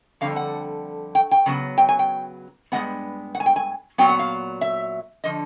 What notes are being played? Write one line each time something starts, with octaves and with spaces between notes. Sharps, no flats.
F2 D3 G3 F5
F#5
G5
G5
C#3 F#3 B3
G5
G#5
G5
G2 D#3 G#3 B3 F#5
F#5
G#5
G5
G#5
A#2 F#3 B3 G5
F#5
F5
E5
D3 F3 D#5